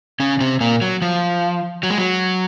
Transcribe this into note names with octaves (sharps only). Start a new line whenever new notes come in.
C#3 C#4
C3 C4
A#2 A#3
F#3
F3
F#3
G#3
F#3